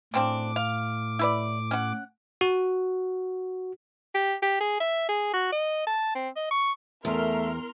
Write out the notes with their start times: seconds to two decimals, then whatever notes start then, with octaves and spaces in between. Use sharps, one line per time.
0.14 A2 C#3 C4 D4 D6
0.56 F5
1.19 E4 B4 D5
1.71 C#4 F#5
2.41 F#4
4.15 G4
4.43 G4
4.61 G#4
4.80 E5
5.09 G#4
5.33 F#4
5.52 D#5
5.87 A5
6.15 C4
6.36 D#5
6.51 C#6
7.05 E2 A3 A#4 E5 C6 F6